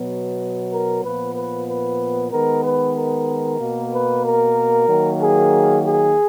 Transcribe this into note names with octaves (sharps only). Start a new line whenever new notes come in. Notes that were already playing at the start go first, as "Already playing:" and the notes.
Already playing: B2 F#3 B3
A#4
A#2 F3 B3 B4
B4
B4
D#3 G#3 B3 A#4
B4
A#4
B2 A#3
B4
A#4
D#3 F#3 A#3
G#4
G#4